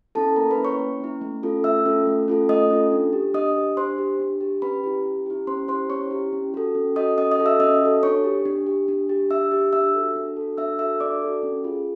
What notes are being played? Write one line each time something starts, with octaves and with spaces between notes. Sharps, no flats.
C#4 E4 A4 A5
A#3 A#4 A#5
B4 B5
C#4 E4
C#5 C#6
A#3
C#4 E4
A3
C#4 F4 A4
A3 E5 E6
C#4 F4 A4
A3
C#4 F4 A4
A3 D#5 D#6
C#4 F4 A4
D4
G4
D4 D#5 D#6
G4
D4 C5 C6
G4
D4
G4
C#4 B4 B5
E4 G4
C#4
E4 G4
C#4 C5 C6
E4 G4 C5 C6
C#4 C#5 C#6
E4 G4
C#4
F#4 A4
C#4
F#4 A4 D#5 D#6
C#4 D#5 D#6
D#5 D#6
F#4 A4
E5 E6
C#4 D#5 D#6
F#4 A4
D4 C#5 C#6
G4
D4
G4
D4
G4
D4 E5 E6
G4
D4 E5 E6
F#4 A4
D4
F#4 A4
D4 E5 E6
F#4 A4 E5 E6
D4 D5 D6
F#4 A4
C#4
F4 G#4